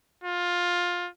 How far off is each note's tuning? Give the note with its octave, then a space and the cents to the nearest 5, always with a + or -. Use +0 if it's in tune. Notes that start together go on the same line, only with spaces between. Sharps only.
F4 +15